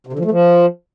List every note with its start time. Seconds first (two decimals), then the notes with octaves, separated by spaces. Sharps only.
0.07 C3
0.13 D3
0.19 F3
0.25 A3
0.31 F3